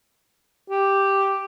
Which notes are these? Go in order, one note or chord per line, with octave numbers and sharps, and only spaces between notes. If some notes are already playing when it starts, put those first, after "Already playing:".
G4